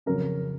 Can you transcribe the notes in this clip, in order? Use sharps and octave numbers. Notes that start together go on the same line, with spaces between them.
F2 C#3 F#3 C#4 A#4